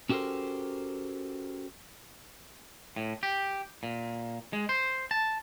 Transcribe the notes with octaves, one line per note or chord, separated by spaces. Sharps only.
C#4 F#4 G4 A4 A#4 C5
A2
G4
A#2
G#3
C5
A5